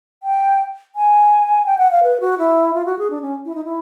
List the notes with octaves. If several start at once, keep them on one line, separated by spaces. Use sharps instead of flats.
G5
G#5
G5
F#5
F5
B4
F#4
E4
F4
F#4
G#4
D4
C#4
E4
D#4
E4